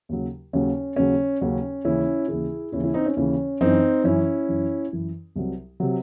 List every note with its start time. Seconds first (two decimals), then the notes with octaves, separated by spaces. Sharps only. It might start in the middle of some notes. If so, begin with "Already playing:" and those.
0.09 D#2 C#3 F#3
0.53 D#2 C#3 F#3 C#4
0.96 D#2 C#3 F#3 C#4
1.41 D#2 C#3 F#3 C#4
1.85 D#2 C#3 E3 C#4 E4
2.28 D#2 C#3 E3 E4 G#4
2.72 D#2 C#3 E3 C#4 E4
2.84 C#4 E4
2.94 C4 D#4
3.06 C#4
3.16 D#2 C#3 E3 C#4
3.61 F#2 E3 C4 D#4
4.04 F#2 E3 C#4 E4
4.49 F#2 E3
4.93 F#2 E3
5.36 C2 C3 F#3
5.80 C3 F#3